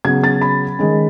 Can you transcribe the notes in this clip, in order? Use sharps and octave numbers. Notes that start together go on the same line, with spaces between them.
C#3 F#3 B3 G#6
A6
B5
D#3 G#3 C#4